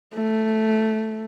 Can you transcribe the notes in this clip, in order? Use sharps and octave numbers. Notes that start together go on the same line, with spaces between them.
A3